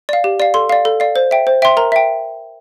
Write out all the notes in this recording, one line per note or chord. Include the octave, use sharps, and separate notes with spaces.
D5 F5
G4
D5 F5
A4 C6
D5 F5
A4
D5 F5
C5
E5 G5
C5
E5 G5 C6
A#4 A#5
E5 G5